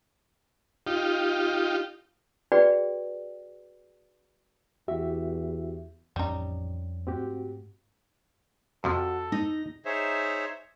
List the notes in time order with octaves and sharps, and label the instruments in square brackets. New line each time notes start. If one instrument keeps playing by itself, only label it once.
[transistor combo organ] D#4 F4 G4
[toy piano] F#4 G#4 B4 D5 G5
[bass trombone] E2 [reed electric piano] F#4 G4 E5
[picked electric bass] A1 F3 [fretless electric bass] F2 C#4 [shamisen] G3 D#4
[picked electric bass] G#2 A3 [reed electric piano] C4 F#4 G4
[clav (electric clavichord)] F2 C3 F3 [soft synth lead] F#4 [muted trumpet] A4
[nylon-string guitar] D#4 [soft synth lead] A#6
[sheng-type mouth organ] D#4 G#4 C5 C#5 E5